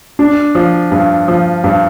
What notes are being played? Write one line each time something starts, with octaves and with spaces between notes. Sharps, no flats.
D4
F3
G2
F3
G2